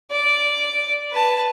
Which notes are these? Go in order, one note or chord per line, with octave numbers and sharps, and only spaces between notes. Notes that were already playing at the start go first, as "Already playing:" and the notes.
D5
B4 A5